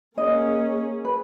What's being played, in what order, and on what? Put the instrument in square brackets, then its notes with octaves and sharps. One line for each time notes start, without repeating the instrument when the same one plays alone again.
[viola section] A#3 C#4 G#4 [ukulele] D#5
[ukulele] B4